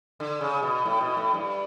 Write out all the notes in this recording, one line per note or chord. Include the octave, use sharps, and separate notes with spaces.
D3
C#3
B2
A2
B2
A2
G2